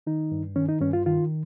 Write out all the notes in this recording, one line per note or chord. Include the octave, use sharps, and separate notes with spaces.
D#3 D#4
G2
D#3 C#4
D#4
G2 C#4
F4
D#3 F4